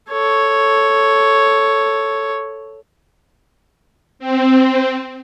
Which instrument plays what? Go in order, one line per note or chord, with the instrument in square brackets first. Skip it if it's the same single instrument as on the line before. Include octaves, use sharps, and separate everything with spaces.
[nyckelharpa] A4 C#5
[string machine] C4